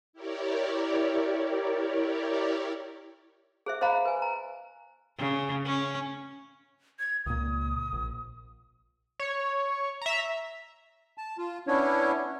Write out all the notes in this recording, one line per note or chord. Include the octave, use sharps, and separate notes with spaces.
E4 G4 A#4 C#5 D5
G#4 C5 E5
C5 D#5 F5 A#5 B5
B4 G#5
A#5
C#3
C#4
G#6
C#2 A#2 D#6
A#1
C#5
E5 A#5
A5
F4
B3 C#4 D4 E4 C#5